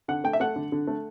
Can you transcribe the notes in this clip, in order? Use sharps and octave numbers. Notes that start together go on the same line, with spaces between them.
D3 F#5
A3 G5
E5
A3 F#5
D3
D3
A3